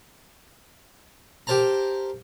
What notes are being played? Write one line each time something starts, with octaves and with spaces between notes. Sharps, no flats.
G4 A#4 C5 A5 A#5